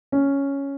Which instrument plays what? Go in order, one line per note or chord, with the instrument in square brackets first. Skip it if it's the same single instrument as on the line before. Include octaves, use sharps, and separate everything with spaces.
[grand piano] C#4